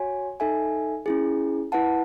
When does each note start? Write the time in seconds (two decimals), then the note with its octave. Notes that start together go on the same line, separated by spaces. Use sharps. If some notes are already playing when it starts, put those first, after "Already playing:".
Already playing: F#4 C#5 G#5
0.40 D#4 A4 E5 G#5
1.06 C#4 E4 G#4
1.72 E4 B4 F#5 A5